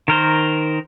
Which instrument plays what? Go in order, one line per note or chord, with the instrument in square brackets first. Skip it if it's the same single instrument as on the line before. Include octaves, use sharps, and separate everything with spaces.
[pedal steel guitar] D#3 A#4 C5